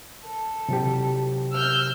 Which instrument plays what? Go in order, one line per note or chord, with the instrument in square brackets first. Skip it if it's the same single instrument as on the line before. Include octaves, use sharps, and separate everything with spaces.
[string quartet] A4
[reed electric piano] C3 F#3 G4
[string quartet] E6 F6 G6